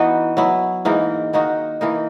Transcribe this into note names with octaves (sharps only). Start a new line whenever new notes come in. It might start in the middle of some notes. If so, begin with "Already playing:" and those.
Already playing: E3 B3 D#4 F#4
F#3 B3 E4
G#2 E3 A#3 D#4
D#3 A#3 D#4 F#4
E3 A#3 D#4